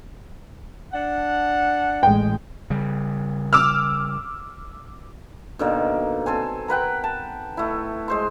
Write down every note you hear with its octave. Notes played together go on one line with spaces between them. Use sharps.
D4 F#5
A1 A2 G#3 G5
C#3 G3
D6 E6 F6
B2 D3 D#3 A#3
C4 A4 C5 G#5
A#4 B4 F#5 G5
A5
A3 E4
G#3 C5 C6